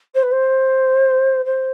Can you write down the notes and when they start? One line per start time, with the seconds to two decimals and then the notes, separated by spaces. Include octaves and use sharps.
0.14 C5
0.22 B4
0.31 C5
1.45 C5